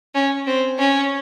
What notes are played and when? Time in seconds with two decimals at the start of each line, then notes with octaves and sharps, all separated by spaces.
0.15 C#4
0.47 C4
0.79 C#4